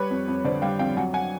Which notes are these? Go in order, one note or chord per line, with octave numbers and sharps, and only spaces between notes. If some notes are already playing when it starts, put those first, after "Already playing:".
Already playing: G3 B4 C#5
F2
F2
D3 C5 D5
G3 F5 G5
F2 F5 G5
F#3 F#5 G#5
F#5 G#5